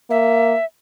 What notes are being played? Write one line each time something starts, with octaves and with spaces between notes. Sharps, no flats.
A#3 E5